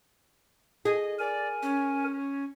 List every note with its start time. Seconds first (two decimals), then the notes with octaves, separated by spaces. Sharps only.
0.85 G#4 D#5
1.19 A#4 D5 G#5
1.62 C#4